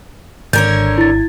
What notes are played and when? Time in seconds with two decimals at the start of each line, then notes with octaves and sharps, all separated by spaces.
0.53 G#1 D3 A#4 C#5 G6 G#6
0.98 E4 A6